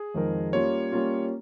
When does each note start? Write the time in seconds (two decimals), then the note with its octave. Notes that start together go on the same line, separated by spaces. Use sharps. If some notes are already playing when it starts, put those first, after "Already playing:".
Already playing: G#4
0.14 F2 D#3 G#3 D#4 A#4
0.53 G3 A#3 C#4 F4 C#5
0.92 G3 A#3 C#4 F4